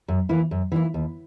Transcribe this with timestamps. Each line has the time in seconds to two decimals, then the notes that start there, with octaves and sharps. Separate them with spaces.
0.08 F#2
0.29 E3 A#3 E4
0.51 F#2
0.72 E3 A#3 E4
0.94 D#2